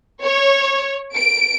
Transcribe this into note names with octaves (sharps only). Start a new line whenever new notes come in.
C#5
D7